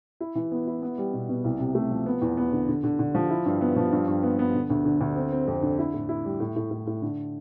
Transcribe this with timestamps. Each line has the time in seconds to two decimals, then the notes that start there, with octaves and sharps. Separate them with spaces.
0.20 E4
0.35 E3
0.52 B3
0.67 E4
0.82 B3
0.98 G3
1.13 B2
1.29 B2
1.44 C2
1.59 C3
1.75 A3
1.91 F3
2.06 B3
2.22 E2
2.37 B3
2.53 D3
2.68 D3
2.84 D3
2.99 D3
3.15 F3
3.30 E4
3.46 G2
3.61 B3
3.76 F3
3.92 G2
4.08 G2
4.23 B3
4.39 B3
4.54 D3
4.70 D2
4.85 D3
5.01 D2
5.16 C4
5.32 C4
5.47 F2
5.63 D3
5.79 E4
5.94 A2
6.09 E4
6.24 G3
6.40 A2
6.56 A2
6.71 A2
6.87 A2
7.02 D3